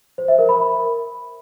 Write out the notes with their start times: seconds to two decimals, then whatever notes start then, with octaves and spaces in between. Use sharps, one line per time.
0.18 C5
0.28 E5
0.39 A#4
0.49 B5